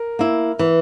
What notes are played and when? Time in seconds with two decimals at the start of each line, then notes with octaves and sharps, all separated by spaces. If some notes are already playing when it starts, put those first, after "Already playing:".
Already playing: A#4
0.19 A#3 E4
0.59 E3